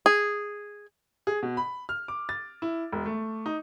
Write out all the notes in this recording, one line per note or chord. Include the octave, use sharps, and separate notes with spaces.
G#4
G#4
B2
B5
F6
D6
A6
E4
E1
A3
D#4